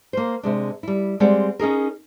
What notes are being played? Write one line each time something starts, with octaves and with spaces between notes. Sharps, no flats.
A#3 C5
C3 G#3 D4
G3 E4
G3 G#3 C4 D5 F#5
C#4 D#4 G#4 A#4